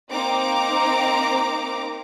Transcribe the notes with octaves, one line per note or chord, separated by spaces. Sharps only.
A#3 C4 D#4 A#5 D6